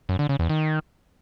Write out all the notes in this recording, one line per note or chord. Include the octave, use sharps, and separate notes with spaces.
F#2
D3
C#3
E2
D#3